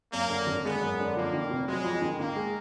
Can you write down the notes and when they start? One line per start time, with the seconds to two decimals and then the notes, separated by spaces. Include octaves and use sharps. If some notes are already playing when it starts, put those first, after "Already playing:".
0.13 F#2 A#3
0.30 D3
0.47 G#1
0.65 G#3 B3
0.81 F#2
0.99 D3
1.16 F2 A#3
1.33 D#3
1.50 F1
1.68 F#3 G#3
1.85 F2
2.01 D#3
2.20 D#3 A#3
2.36 G#3